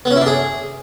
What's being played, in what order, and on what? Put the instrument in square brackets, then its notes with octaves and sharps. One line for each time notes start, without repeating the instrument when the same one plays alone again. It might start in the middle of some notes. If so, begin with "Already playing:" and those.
[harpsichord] B3
C#4
E4
D4
G#4